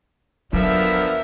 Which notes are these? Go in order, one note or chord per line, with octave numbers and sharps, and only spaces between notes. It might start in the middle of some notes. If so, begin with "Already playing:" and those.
D3 F3 F#3 B3 A#4 E5